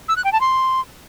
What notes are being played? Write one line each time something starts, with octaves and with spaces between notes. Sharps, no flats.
E6
F#6
G5
A5
C6